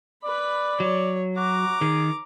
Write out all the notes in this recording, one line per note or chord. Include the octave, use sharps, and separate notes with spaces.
B4 D5 B5
F#3 C#5
F#4 A#5 D6
D#3 G#4